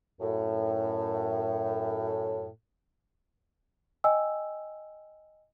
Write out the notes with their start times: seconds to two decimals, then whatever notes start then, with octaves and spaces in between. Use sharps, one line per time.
0.20 F#2 A2
4.04 D#5 G5 G#5 E6